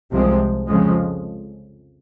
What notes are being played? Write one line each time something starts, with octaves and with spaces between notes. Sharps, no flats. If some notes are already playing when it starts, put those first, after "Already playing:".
C2 C3 F3 G#3 C4
F2 C#3 F3 G#3